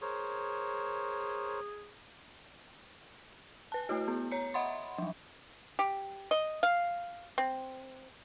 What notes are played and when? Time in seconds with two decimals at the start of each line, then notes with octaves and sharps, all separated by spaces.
0.02 G#4 A#4 C5 C#5
3.72 B4 A5
3.89 A3 E4 F#4
4.08 B3
4.31 C#5 A#5 C#7
4.54 D#5 E5 F#5 B5 C6
4.98 F3 F#3
5.79 G4
6.31 D#5
6.63 F5
7.38 C4